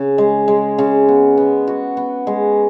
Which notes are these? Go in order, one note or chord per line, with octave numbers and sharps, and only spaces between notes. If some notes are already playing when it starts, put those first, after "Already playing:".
Already playing: C#3
G#3
G#3
C#3
B3
B3
F#4
B3
G#3